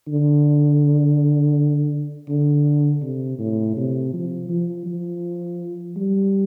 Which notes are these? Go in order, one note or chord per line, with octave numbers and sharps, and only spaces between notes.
D3
D3
C3
A2
C3
F3
F3
F3
G3